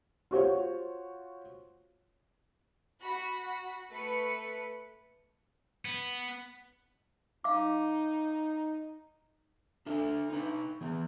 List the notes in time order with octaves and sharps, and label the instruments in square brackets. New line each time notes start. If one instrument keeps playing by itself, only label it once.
[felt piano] F4 F#4 C5 C#5
[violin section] F#4 B5
A3 B4 C#7
[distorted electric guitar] B3
[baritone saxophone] D#4 [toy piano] F5 D6
[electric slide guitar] D4 A4 E5
D#4 B4
E3 B3